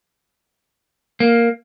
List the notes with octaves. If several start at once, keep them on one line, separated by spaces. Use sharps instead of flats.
A#3